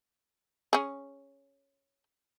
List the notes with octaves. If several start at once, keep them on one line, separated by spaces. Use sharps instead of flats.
C#4 G#4